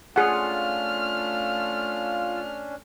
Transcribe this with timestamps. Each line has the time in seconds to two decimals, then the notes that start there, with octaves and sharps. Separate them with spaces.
0.16 A3 C#4 D4 F4 G#4 F#5 F6